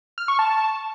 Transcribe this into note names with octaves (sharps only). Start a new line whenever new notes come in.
F6
C#6
A5